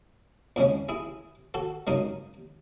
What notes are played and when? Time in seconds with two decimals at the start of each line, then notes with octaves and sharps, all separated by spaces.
0.56 E2 C#3 G#3 C#4
0.89 E4 G#4
1.54 F#4 A4
1.87 F#2 C#3 G#3 D#4